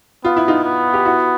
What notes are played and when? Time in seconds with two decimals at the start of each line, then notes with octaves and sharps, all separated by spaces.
0.24 B3 F4
0.36 E4
0.48 D#4 F4
0.65 B3
0.94 G4
1.05 E4 F#4